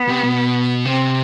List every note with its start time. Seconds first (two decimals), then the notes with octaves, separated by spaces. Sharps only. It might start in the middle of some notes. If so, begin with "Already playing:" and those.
Already playing: B3
0.08 C3
0.23 B2
0.85 C3 C4